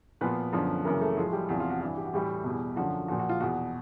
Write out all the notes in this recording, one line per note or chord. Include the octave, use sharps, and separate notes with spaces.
A#2 F3 B3 B4
F#2 D3 F3
F#2 C#3 E3 A#3 A#4
A3 A4
A2 F3 G#3 G#4
G3 G4
E2 C3 F3 F#4
F4
F#4
G2 E3 F#4
G4
F#4
A2 E3 G3 G4
E2 B2
F#2 D3 F3 F#4
A#2 F3 F#4
F#4
F4
E2 B2 F#4